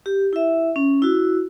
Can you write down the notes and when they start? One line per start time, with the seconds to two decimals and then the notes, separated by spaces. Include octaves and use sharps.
0.06 G4
0.33 E4 E5
0.76 C#4
1.02 E4 F#4